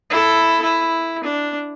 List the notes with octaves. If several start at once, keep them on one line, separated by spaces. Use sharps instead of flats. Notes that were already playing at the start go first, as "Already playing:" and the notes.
E4 A4
E4
D4